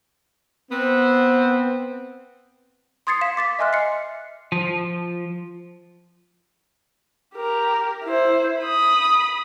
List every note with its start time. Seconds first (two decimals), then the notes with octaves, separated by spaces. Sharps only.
0.70 B3 C4
3.07 C6 D#6 G#6 A6 C7 C#7
3.21 F5 B6 E7
3.37 D6 A6 B6
3.59 D#5 E5 G#5 C6 F6 F#6
3.73 C7 C#7
4.52 F3
7.36 G4 A#4
8.04 E4 C5
8.60 B5 D#6